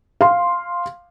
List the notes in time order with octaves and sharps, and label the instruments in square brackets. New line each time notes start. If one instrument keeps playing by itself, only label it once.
[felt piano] F5 C6